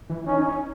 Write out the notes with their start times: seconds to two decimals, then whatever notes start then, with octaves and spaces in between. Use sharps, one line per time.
0.10 E3
0.26 C#4 D#4
0.37 D#4
0.48 C#4